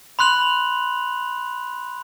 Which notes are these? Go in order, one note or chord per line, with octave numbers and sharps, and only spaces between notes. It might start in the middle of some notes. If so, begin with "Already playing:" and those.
B5 C6 F#6 F7 F#7